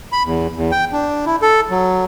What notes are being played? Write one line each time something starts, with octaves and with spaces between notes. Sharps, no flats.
B5
E2
E2
G5
D4
E4
A4
F#3